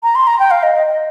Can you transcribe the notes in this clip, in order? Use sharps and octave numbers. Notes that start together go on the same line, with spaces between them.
A#5
C6
A#5
G5
F5
D#5
D#5
D#5